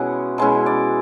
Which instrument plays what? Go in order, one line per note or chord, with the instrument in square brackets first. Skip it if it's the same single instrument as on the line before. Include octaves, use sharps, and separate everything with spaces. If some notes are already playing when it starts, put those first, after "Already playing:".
Already playing: [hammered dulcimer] B2 G#3 C#4 E4 F#5
B2 G#3 C#4 E4
D5